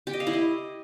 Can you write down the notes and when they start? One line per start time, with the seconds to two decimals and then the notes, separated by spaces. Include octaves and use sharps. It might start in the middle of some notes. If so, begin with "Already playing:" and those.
0.07 G4
0.13 D#5
0.20 F5
0.27 E4
0.33 D#5